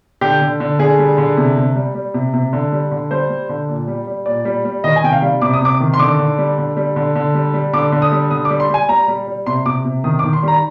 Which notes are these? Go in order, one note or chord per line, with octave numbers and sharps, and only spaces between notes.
D3 G4
D3
D3
D3 G#4
G3
D3
C3
C3
G3
G3
C3
C3
D3
G3
D3
G3 C5
G3
D3
A#2
G3
G3
A#2 D5
G3
G3
D#3 D#5
G#5
C3 G5
F5
G3
C3 D6
D#6
C3 D6
D#3
C6
D3 D6
D3
G3
D3
G3
D3
D3
G3
G3
D3 D6
D3
D#6
G3
D3 D#6
D6
G3
C6
G3 G#5
G3 A#5
G3
G3
C3 C6
C3 D6
C3
D#3 D#6
D6
D#3
C6
G3 A#5